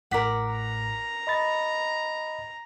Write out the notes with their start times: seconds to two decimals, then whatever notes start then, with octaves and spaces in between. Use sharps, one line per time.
0.11 A1 A2 A#4 D5 F#5 B6
0.52 A#5
1.27 D#5 B5 A6